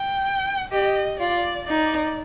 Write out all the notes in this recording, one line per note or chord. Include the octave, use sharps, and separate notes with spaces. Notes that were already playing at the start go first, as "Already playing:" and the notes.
Already playing: G5
G4 D#5
F4 D5
D#4 D5